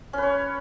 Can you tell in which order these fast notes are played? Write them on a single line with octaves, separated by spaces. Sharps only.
C#4 B4 C#5